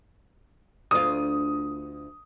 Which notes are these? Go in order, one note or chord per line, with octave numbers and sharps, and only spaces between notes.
D2 F4 D#6